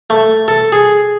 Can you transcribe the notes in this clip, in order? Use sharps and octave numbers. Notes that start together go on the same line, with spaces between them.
A3
A4
G#4